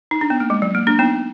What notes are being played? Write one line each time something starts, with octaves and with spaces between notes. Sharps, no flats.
D#4
D4
B3
A#3
G#3
F#3
A#3
A#3 D4
B3 D#4